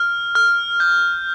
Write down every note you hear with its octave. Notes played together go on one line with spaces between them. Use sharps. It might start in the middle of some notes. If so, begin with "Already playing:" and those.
Already playing: F6
F6
G6